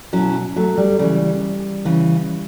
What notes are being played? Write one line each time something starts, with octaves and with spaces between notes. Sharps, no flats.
B2 F#3 C#4 E4
F#3 A3
G3
C#3 E3 G3
C#3 E3